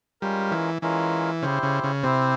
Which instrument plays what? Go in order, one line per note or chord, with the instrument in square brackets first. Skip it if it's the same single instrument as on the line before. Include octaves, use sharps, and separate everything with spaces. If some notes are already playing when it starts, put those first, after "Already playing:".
[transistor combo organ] G3 [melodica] G#3 C#4 F4 A#4
[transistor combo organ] E3
[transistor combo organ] E3 [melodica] G#3 C#4 F4 A#4
[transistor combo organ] C#3 [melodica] E4 G4 C5
[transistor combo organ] C#3
C#3
[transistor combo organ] C3 [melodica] E4 G4 C5